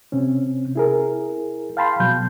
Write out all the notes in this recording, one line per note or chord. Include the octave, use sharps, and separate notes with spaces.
C3 C4 C#4
E4 G#4 A#4
F5 G5 A5 B5 C6
B2 F#3 G6